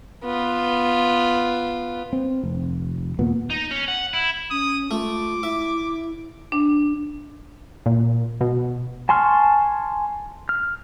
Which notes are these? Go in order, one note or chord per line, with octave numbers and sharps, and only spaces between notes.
B3 F4
C4
F1
D#2 A#2 B3
D#4
C#4
F#5
E4
C#4 D#6
A3 F4 D6
E4 E5
D4
A#2
B2
G#5 A5 C6 C#6 F6
F6